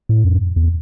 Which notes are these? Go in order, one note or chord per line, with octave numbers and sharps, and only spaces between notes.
A2
F2
E2